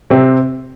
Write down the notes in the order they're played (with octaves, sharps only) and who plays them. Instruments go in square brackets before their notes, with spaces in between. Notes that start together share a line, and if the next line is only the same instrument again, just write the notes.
[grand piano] C3 C4